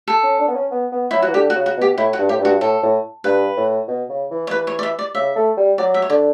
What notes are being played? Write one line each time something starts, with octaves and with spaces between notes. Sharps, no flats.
A4
C#4
D4
B3
C#4
B3
B3
F#3 E4
F#4
E3
D3 G4
F#4
C#3
F#4
B2 G4
A2 E4
F#4
G2
A2 G4
G2
F#4
A2 A4
A2
G2 B4
A2
B2
C#3
E3
C#5
E3 B4
C#5
D5
E5
D5
C#3 E5
A3
G3
F#3 D5
E5
C#5
D3 D5